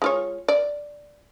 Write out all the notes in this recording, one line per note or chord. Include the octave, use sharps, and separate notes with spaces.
G#3 F4 C#5
D5